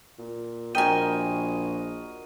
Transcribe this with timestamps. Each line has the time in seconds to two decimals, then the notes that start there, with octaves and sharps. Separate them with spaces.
0.19 A#2
0.75 A#1 F#4 A#4 D#5 G5 G#5 D#7